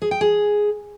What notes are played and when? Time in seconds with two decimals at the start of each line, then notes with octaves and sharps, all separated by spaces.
0.02 G#4
0.11 G5
0.21 G#4